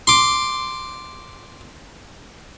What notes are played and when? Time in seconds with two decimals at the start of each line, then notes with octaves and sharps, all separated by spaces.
0.07 C6 D6